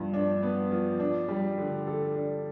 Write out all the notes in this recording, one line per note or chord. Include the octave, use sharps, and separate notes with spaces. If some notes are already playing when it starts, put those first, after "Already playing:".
Already playing: G2 F3 B3
D4
B3
F3
D4
G3
D3
A4
D4